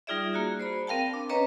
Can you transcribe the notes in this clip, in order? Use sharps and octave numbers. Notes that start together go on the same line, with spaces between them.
G3 D#4 F4 G#4 D5 E5
A#3 F#4 G#4
C5 D5 B5
C4 A#4 F5 G5 A5
D4
C#4 B4 C#5 D#5 A#5